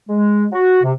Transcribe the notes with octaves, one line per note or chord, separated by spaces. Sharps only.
G#3
F#4
C3